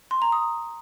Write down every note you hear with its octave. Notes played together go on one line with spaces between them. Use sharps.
C6
A#5
D#6